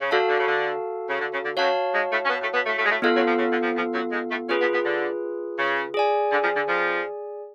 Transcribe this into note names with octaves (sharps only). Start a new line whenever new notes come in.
C#3
D3 F#4 A4 F5 A5
D3
C#3
D3
C#3
D3
C#3
D3
F#2 F#3 F#4 C#5 F5 A5
G#2 G#3
A2 A3
C#4
B2 B3
A2 A3
B2 B3
A2 A3
A2 A3
G#3
A2 A3
G#2 G#3 B3 F4 A4 F5
F#2 F#3
F2 F3
C#3
D3
F2 F3
F2 F3
F#2 F#3
G#2 G#3
A2 A3
C#3 C#4 F4 G#4 B4
B2 B3
B2 B3
D3
C#3
G#4 D5 G#5
D3
F2 F3
D3
F2 F3